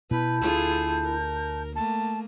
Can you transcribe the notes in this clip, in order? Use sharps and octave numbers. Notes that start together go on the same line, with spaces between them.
B2 B3 E4 B4 A5 G6
D2 F4 G#4 A4
A#4
A3 A#3 A5